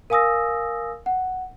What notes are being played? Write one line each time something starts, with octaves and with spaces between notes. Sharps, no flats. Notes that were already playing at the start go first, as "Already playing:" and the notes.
A#4 F5 G#5 D#6 E6 A#6
F#5